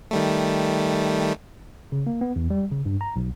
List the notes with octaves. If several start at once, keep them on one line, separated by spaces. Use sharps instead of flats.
D#3 G3 A3
C#3
A#3
B3
E2
G3
C#3
G2
A#5
B1